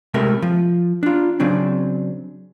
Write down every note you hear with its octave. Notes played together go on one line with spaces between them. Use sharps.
C3 G#3 A3 A#4 E5
F3
D4 F4
C#3 F#3 C4 D4